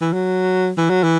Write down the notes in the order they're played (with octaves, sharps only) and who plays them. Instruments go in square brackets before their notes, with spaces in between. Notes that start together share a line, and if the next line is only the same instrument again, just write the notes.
[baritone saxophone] E3
F#3
E3
F#3
E3